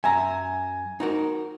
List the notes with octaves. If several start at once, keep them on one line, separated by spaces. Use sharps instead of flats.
F#2 E5 G#5 A#5
D#4 F#4 A#4